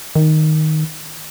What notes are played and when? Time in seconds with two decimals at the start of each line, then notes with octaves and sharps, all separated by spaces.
0.16 D#3